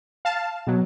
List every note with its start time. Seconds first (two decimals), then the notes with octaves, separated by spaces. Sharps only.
0.25 F5 A5
0.67 B2 F#3